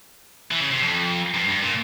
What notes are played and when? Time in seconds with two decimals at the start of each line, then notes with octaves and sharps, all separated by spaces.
0.51 E3
0.60 C#3
0.71 C3
0.82 F2
1.34 G2
1.49 G2
1.63 A#2